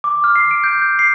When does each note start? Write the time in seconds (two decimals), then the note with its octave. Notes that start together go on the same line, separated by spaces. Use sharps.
0.04 D6
0.24 F6
0.36 C7
0.51 D7
0.64 G6
0.82 G6
0.99 C7